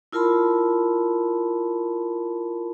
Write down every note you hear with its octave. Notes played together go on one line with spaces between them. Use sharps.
E4 F4 A#4 A5 B5 C6